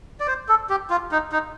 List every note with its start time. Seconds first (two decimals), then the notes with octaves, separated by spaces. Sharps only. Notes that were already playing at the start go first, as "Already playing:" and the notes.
0.20 D5
0.28 C5
0.49 A4
0.70 G4
0.90 F4
1.12 D#4
1.32 D#4